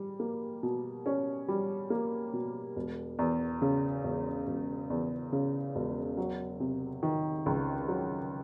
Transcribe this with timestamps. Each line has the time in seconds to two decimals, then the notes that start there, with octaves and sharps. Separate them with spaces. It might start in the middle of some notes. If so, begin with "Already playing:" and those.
Already playing: G3
0.20 A#3
0.63 B2
1.06 C#4
1.48 G3
1.90 A#3
2.33 B2
2.76 E1
3.19 E2
3.62 C#3
4.04 E1
4.47 E1
4.90 E2
5.32 C#3
5.75 E1
6.17 F#3
6.60 C3
7.03 D#3
7.46 C#2
7.88 F#3